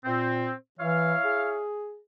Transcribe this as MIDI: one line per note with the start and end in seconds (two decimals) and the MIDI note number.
0.05 0.53 46
0.05 0.53 60
0.79 1.14 52
0.79 1.62 64
0.79 1.62 73
0.79 1.62 77
1.25 1.99 68